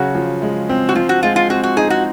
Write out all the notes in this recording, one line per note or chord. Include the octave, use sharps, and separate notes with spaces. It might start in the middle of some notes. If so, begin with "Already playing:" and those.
Already playing: C#3 F#3 F#4
F3
G#3
C4
F#4
F3 F4
F#4
G#3 F4
F4
C4 F#4
F#4
D#4 G#4
F#4